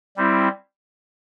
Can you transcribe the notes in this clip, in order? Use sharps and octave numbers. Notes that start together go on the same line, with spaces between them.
G3 C4 E4